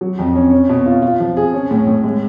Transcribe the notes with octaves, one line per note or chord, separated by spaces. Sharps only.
F#3
F2
C#4
C#4
B2
F4
F4
F3
G#4
C#4
A2
A2
G#3